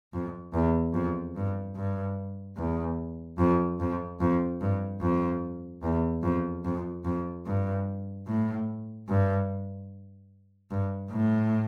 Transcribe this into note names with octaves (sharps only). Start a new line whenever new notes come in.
F2
E2
F2
G2
G2
E2
F2
F2
F2
G2
F2
E2
F2
F2
F2
G2
A2
G2
G2
A2